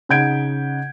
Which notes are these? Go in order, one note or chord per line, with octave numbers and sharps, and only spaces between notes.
C#3 D#4 F#5 G6 G#6 D7